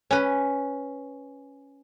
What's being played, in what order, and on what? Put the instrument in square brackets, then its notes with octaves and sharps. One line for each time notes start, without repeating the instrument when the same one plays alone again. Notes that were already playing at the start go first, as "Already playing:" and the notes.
[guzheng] C#4 B4